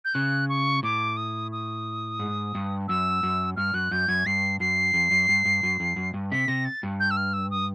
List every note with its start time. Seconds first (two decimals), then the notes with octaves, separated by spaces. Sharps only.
0.05 G6
0.14 C#3 F#6
0.49 C#6
0.83 A2 D6
1.17 D#6
1.52 D#6
2.19 G#2
2.55 G2
2.88 F#2 E6
3.23 F#2
3.56 G2 F6
3.74 F#2 F#6
3.91 F#2 G6
4.08 F#2 G#6
4.26 G2 C7
4.60 F#2 C7
4.94 F2
5.11 F#2
5.29 G2
5.45 G2
5.63 F#2
5.80 F2
5.96 F#2
6.14 G2
6.32 C3 B6
6.48 C3 A#6
6.65 A6
6.83 G2
7.00 G6
7.11 E6
7.17 F6
7.33 E6
7.51 D#6